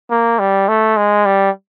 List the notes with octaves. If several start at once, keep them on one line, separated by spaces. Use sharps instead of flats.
A#3
G3
A3
G#3
G3